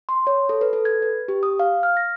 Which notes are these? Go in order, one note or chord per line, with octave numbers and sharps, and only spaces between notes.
C6
C#5
A4
B4
A4
G#6
B4
G4
D#6
F5
F6
A#6